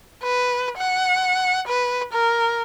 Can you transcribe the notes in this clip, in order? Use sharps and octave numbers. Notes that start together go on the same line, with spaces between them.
B4
F#5
B4
A#4